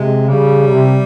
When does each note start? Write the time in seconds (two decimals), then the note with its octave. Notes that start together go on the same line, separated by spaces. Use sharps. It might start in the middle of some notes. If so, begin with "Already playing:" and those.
Already playing: C3 G#3
0.29 C#3 G3
0.67 C3